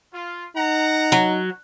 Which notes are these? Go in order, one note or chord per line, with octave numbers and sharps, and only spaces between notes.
F4
D#4 F#5 A#5
F#3